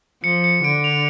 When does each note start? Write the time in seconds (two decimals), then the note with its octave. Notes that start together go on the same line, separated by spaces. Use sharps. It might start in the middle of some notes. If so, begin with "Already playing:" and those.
0.23 F3 C#7
0.44 C#7
0.64 D3 D7
0.84 F7